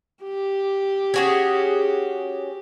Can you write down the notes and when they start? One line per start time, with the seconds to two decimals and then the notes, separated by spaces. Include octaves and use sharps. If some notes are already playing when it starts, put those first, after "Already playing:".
0.23 G4
1.14 C#4 F#4 G#4